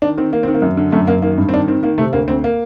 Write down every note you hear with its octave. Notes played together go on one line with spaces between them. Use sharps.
D#3 D4
D#3 C4
D#3 A#3
D#3 C4
A#3
F#2
D3
F#2 A3
F#2 A#3
D#3 A#3
G2
C4
D#3 D4
D#3 C4
D#3 A#3
C3 A3
D2 A#3
D2 C4
A#3